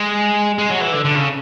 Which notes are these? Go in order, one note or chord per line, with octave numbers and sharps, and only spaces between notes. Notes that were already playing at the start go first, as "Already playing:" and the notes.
Already playing: G#3
G#3
F#3
E3
D3
D3
C#3